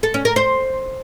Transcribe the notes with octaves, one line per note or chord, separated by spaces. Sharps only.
A4
C#4
A#4
C5